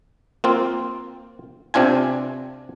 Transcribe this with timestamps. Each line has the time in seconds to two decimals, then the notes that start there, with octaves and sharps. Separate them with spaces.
0.44 A#3 C4 F4
1.74 C3 C4 D4 F4 G#5